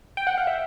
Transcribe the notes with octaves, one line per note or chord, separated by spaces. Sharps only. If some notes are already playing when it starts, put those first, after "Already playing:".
G5
F#5
F5
E5